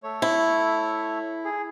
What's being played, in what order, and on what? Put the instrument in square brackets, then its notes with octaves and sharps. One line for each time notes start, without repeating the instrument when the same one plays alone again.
[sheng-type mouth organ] A3 C#5
[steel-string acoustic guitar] E4
[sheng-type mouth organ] G#4